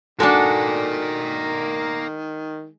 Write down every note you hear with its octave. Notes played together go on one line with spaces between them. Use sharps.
D#3 G#3 D4 F#4 A4 A#4 D5